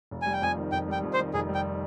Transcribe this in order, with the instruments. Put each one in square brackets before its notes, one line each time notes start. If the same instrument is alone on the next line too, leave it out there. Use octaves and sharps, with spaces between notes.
[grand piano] F1
[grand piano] G3 [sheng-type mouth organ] G#5
[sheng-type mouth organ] G5
[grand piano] F2 [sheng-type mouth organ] G#5
[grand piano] D#3
[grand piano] F1 [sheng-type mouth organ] G5
[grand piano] G3 [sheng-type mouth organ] G5
[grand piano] F2
[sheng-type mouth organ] C5
[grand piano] D#3
[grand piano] F1 [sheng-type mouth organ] G#4
[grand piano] G3
[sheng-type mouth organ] G5